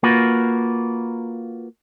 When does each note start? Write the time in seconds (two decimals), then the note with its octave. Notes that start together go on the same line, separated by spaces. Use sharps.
0.03 A#3 F4 F#4 A#4 B4